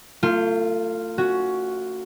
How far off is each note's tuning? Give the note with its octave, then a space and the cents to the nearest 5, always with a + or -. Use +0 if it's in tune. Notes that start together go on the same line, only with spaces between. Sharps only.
A3 +40 F4 -5
C#4 +10 F#4 +0